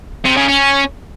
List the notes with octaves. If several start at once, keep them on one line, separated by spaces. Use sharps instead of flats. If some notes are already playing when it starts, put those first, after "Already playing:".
C3
C#3
C#4